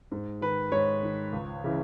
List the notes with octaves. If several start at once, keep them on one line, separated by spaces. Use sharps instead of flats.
G#2
D#3 B4
G#2 C#5
D#3
C#2
C#3 E3